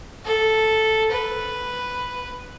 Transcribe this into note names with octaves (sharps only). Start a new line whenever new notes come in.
A4
B4